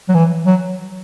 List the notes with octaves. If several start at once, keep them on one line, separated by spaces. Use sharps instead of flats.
F#3
E3
F#3